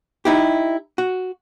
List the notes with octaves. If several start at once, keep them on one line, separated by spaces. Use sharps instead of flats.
D#4 E4 G4
F#4